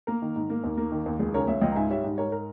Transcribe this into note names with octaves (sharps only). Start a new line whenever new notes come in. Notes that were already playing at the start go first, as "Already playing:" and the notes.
A#3 A#4
D#3
G#2
A#3
D#2
A#3
D#3
D#2
C#2 G#4
C#3 A#4 C#5
C#2 C#5 E5
C#2 D#5 G5
A#5
G#2 E5 G#5
G3 C#5 E5
G#2
G#2 A#4 C#5
A#4